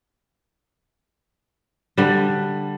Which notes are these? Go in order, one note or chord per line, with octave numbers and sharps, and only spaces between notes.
D3 G3